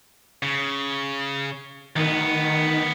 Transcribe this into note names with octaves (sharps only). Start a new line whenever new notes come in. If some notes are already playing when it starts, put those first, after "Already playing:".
C#3
D2 D#3 B3